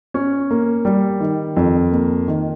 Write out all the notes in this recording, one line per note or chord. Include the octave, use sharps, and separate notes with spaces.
C#4
A#3
G3
D#3
F2
A#3
D#3